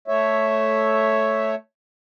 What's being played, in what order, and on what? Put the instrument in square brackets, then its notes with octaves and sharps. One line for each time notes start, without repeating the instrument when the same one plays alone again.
[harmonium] A3 C#5 E5